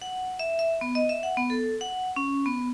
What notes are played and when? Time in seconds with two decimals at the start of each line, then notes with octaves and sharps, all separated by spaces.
0.02 F#5
0.39 E5
0.59 E5
0.81 B3
0.95 D#5
1.09 E5
1.23 F#5
1.37 B3
1.50 A4
1.81 F#5
2.16 C#4
2.46 B3